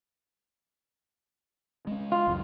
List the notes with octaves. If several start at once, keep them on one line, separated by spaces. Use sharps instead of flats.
G#3 C#4
F4
C#2 F#2